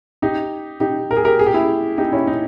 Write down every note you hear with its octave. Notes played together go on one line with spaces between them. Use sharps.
D#4 G4
D#4 G4
A#4
G#4
G4 A#4
G#4
G4
E4 G#4
D#4 G4
C#4 E4
D#4